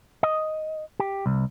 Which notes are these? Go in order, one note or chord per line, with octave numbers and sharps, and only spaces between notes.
D#5
G4
C2